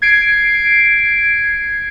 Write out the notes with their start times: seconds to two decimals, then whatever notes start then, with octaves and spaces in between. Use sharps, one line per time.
0.02 G#6 C7 D7